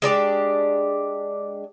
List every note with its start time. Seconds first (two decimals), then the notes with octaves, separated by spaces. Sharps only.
0.02 G#3 D4 G4 D5